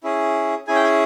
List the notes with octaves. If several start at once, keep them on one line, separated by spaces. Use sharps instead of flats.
C#4 E4 G#4
C#4 E4 G#4 G#5
G5
G#5